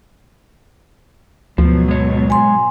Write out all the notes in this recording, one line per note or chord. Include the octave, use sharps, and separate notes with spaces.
D2 G#2 B2 F3 F#3
G#3 C#5
G#5 C6